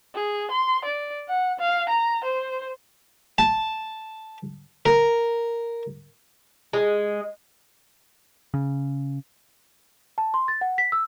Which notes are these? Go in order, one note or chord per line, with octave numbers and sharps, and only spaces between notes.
G#4
C6
D5
F#5
F5
A#5
C5
A5
A#4
G#3
C#3
A5
C6
A6
F#5
B6
E6